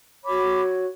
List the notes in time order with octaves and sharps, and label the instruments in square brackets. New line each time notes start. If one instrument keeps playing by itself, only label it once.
[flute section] F#4 C#5 B5 D6